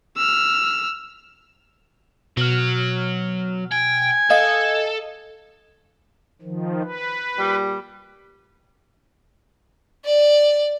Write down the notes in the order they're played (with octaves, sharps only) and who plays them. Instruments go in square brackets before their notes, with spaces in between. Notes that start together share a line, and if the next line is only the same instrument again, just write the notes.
[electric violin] E6 F6
[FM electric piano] B2 F6 [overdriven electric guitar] F#3
[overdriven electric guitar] G5 [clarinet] G#5
[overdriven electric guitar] A4 [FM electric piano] D#5 [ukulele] F5
[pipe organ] D#3 F3
B4
[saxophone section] A#2 G3
[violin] D5